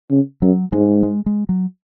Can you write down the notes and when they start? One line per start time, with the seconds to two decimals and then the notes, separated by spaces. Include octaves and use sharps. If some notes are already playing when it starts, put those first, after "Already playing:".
0.11 C#3
0.42 F#2 F#3
0.73 G#2 G#3
1.03 G#3
1.26 G#3
1.49 F#3